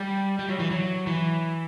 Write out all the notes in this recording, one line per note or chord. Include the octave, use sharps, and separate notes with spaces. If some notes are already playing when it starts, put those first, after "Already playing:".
Already playing: G3
G3
F#3
E3
F#3
E3